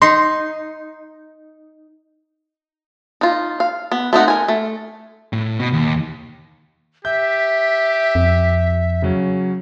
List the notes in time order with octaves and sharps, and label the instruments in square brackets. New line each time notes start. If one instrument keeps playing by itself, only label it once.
[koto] D#4 [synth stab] C6
[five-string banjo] D#4 F4
F5
B3
A3 C4 D#4 F#5
A#4 G#5
A3
[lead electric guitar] A2
B2
D#2
[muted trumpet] G4 [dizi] E5 [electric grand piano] G6
[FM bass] F2
[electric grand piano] C#3 F#3 C#4